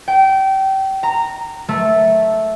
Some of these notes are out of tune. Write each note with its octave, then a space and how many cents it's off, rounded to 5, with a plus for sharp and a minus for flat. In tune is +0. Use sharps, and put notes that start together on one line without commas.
G5 -25
A#5 -15
A3 -10